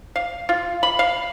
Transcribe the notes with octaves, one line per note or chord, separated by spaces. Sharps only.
F5
F4
B5
F5